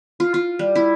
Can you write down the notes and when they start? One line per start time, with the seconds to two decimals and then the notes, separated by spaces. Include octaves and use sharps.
0.20 F4
0.34 F4
0.59 G3
0.75 E4